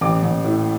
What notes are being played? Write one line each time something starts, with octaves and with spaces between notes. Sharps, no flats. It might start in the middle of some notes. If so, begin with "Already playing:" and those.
A1 D6
A1
A2